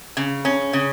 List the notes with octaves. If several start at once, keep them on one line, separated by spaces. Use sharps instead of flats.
C#3
C#4
C#3